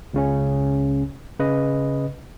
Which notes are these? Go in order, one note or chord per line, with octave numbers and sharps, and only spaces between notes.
C#2 C#3 C#4
C#3 B4 D#5